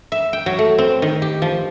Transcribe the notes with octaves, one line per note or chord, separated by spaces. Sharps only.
E5
G5
F#3
A3
C4
D#3
G4
F3